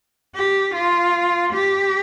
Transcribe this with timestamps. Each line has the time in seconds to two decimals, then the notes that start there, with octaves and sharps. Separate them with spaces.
0.35 G4
0.75 F4
1.53 G4